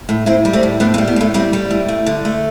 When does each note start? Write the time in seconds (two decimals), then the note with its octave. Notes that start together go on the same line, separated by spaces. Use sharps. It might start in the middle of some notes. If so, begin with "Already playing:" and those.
0.09 A2
0.26 A2 C4 E4
0.45 G3
0.53 A3 C4
0.63 A2
0.80 A2 B3 D4
0.94 A3 C4
0.98 G3
1.07 B3
1.16 A2 A3
1.34 G3 A3 C4
1.53 G3
1.71 A2
1.88 A3
2.06 D3
2.25 A3